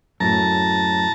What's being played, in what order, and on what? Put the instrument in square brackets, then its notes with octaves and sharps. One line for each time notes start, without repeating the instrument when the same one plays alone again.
[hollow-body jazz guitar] F#2 A2 [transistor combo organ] A5 A#5